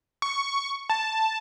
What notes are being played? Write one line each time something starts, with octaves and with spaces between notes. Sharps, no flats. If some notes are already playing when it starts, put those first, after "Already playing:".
C#6
A5